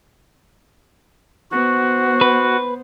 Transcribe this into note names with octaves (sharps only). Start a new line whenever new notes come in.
B3 F#4 C5
B4